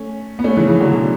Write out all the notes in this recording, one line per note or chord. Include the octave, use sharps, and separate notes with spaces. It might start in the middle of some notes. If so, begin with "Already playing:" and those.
Already playing: A3 C#4
B3
A3 C#4
C#3 E3
C#3 E3
D3 F#3
B2 D3